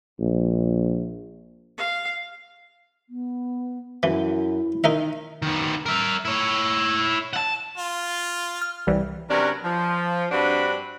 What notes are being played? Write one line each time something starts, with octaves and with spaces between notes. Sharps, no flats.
A#1
F5
B3
F#2 E3 E4
D#3 D#4 A#4 E5
D#3 B3
A#4 E5
E4 C#5
F#5 A5
F4
F6
C2 E3 G3
C3 F#3 C#4 D4 A#4 B4
F3
G2 C4 D4 F#4 B4 B5